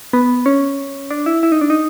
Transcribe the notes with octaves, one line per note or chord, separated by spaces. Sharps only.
B3
C#4
D4
E4
E4
D#4
D4
D#4